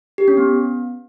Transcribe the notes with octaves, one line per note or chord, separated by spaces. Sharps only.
G4
C#4
B3